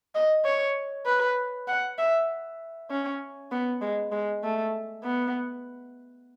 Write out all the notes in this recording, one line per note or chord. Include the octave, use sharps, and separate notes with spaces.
D#5
C#5
B4
F#5
E5
C#4
B3
G#3
G#3
A3
B3